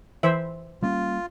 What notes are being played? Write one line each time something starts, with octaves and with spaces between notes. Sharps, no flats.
E3 C5 E5
G3 A#3 C#4 F4